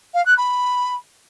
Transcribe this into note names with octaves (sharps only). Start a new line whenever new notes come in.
F5
F#6
B5